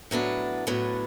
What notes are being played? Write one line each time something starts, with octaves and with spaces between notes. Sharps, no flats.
A2 F#3 B3 D4
A2 F#3 B3 D4